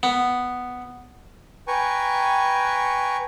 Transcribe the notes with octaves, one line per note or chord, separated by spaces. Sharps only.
B3
B4 G5 G#5 A#5 C#6